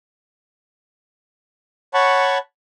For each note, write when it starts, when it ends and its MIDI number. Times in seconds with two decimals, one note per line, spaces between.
1.94 2.38 73
1.94 2.38 78
1.94 2.38 81
1.94 2.38 83
1.94 2.38 85